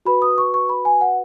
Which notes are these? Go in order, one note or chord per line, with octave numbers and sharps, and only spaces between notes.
F#4 B4 B5
D#6
C#6
C#6
B5
G#5
F#5